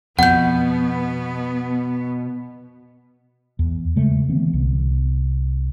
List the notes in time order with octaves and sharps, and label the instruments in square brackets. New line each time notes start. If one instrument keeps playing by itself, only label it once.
[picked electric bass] F2 [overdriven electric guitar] B2 [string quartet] B3 [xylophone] F#5 G6
[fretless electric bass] E2
C#3 G#3 A3
D3 E3 B3 C4
C2